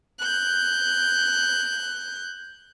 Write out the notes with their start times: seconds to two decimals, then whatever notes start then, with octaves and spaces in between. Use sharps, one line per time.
0.19 F#6 G6